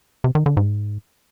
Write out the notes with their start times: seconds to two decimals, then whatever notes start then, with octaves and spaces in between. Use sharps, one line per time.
0.24 C3
0.35 D#3
0.46 D3
0.57 G#2